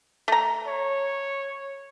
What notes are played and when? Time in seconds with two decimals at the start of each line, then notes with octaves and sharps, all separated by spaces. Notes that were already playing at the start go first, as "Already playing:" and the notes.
0.28 A3 A#5
0.67 C#5